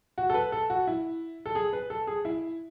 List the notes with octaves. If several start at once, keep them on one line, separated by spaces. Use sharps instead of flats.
F#4
A4
B4
A4
F#4
E4
A4
G#4
B4
A4
G#4
E4